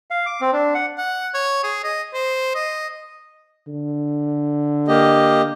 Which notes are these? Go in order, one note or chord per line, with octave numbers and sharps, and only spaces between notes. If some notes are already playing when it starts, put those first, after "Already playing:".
F5
D6
C4
D4
F#5
F#5
C#5
G#4
D#5
C5
D#5
D3
A#3 G4 D#5